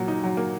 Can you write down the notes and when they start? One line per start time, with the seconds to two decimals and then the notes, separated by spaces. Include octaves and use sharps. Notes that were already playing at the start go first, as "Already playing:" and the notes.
Already playing: A#2 F#3
0.08 D#4
0.24 F#3
0.37 A#3